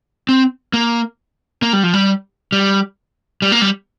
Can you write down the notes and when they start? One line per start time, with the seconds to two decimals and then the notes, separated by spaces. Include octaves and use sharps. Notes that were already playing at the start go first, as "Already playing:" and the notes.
0.29 C4
0.73 A#3
1.62 A#3
1.73 G3
1.83 F3
1.94 G3
2.52 G3
3.42 G3
3.52 A#3
3.62 G3